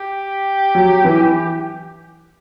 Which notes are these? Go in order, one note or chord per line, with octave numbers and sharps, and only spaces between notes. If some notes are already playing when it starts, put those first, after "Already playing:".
Already playing: G4
F#3
E3